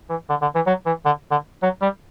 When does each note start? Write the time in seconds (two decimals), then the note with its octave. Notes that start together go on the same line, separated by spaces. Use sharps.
0.10 E3
0.30 D3
0.42 D3
0.55 E3
0.67 F#3
0.86 E3
1.06 D3
1.31 D3
1.63 F#3
1.82 G3